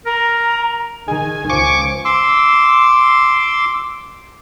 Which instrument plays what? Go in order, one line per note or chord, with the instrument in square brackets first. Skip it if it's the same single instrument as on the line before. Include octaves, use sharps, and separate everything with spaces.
[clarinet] A#4 [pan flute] A#5
[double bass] D#3 [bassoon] G#4 [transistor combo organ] G#5
[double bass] C#2 [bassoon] F3 [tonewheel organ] C#6 D6
[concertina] C6 D6 E6